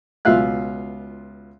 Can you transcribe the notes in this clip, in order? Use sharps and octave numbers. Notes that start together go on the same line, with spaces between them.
C#2 B2 F4 E5 F5 F#6